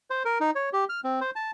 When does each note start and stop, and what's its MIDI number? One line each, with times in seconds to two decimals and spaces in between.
0.10 0.23 72
0.25 0.38 70
0.41 0.50 63
0.55 0.69 73
0.73 0.84 67
0.89 1.00 89
1.04 1.20 60
1.21 1.31 72
1.36 1.51 81